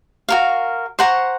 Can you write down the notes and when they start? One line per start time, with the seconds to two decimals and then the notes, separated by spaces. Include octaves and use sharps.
0.29 F#4 A#4 F5
0.99 C5 F#5 A#5 C#6